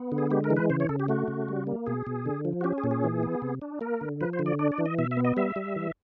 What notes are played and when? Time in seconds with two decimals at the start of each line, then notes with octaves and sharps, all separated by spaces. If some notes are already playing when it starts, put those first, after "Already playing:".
Already playing: B3
0.12 D3
0.18 G#4
0.31 G#3 G4
0.44 A#4
0.50 E3
0.57 B4
0.70 C#3 C5
0.80 C#5
0.89 C#3 A4
1.00 G4
1.08 A3 F#4
1.28 C#3
1.48 G3
1.67 A#3
1.87 B2 G#4
2.07 B2
2.26 D3
2.45 F3
2.61 F#4
2.64 C#4 G4
2.78 G#4
2.84 A#2
2.91 G#4
3.04 E3
3.23 B3
3.42 C3
3.62 D4
3.81 A#3 A#4
4.01 D3
4.21 F3 B4
4.33 C5
4.39 D3
4.46 D5
4.59 D4 D5
4.72 D5
4.78 E3
4.86 D#5
4.99 B2 E5
5.11 E5
5.17 B3
5.25 D#5
5.37 G3 E5
5.56 G3
5.76 E3